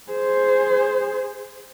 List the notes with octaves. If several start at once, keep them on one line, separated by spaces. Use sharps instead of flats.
G#4 C5